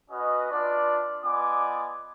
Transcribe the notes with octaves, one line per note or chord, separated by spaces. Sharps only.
C#4 F#4 B4 D#5
D4 F4 B4 D5
B3 F4 D5 D#5 G#5 D6